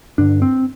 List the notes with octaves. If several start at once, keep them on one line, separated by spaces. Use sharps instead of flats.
G2 D3 D4
C4